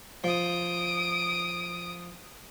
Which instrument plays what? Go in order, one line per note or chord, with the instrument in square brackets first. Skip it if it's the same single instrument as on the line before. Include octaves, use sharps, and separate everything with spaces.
[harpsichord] F3 [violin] D#6 D7